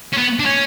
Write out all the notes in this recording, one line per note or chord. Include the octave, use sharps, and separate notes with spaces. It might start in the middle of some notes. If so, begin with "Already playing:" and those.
C#4
B3
D4
C#4